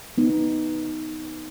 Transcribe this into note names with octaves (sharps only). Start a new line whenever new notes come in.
B3 D#4